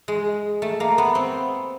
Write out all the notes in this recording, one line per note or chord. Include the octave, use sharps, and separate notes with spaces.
G#3
A3
A#3
B3
C4